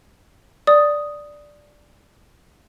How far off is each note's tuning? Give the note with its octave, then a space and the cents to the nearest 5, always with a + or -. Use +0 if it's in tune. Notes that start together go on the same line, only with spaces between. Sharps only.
D5 +0 D#6 +0